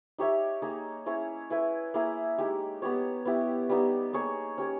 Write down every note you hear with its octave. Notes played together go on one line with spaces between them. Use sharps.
D#4 G4 C#5 E5
A#3 D#4 G#4
C#4 E4 G#4 C#5
E4 G#4 B4 E5
A#3 E4 G#4
G#3 D#4 G4
B3 G4 C#5
B3 E4 G4
G3 B3 D#4 G4
A#3 D#4 G#4 C#5
C#4 G4 C#5